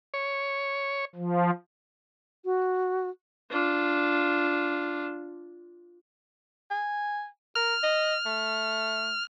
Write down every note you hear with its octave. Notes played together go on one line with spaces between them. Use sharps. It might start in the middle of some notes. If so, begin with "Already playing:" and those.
C#5
F3
F#4
D4 F4
G#5
A#4 F6
D#5
A3